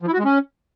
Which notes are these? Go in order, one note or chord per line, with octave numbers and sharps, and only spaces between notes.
F3
E4
F#4
G#3
C#4